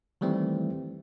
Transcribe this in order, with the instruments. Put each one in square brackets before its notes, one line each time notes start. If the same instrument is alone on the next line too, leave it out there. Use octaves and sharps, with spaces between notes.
[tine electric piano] D#3 E3 G3 A3 C4